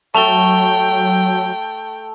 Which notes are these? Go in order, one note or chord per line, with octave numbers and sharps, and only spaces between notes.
F#3 A3 A4 G5 A5 F7 G7